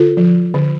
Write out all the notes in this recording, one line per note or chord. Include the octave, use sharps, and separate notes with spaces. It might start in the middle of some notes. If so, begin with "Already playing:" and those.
Already playing: D3 F4 A4
F3
D3